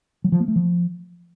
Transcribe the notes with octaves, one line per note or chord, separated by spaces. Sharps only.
F#3
F3
A#3
A3
F3